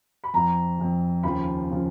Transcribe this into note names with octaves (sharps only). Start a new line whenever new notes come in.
B5
F2 F3 A#5
F2 F3
D#2 C#3 F3 B5
C#3 F3